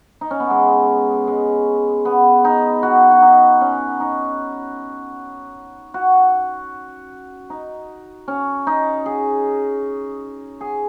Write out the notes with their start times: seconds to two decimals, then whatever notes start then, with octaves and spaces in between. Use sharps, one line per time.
0.21 D#4
0.31 C#4
0.40 B3
0.50 G#3
1.28 G#3
2.05 B3
2.45 D#4
2.83 F#4
3.11 F#4
3.22 D#4
3.61 C#4
4.00 D#4
5.94 F#4
7.50 D#4
8.28 C#4
8.67 D#4
9.06 G#4
10.61 G#4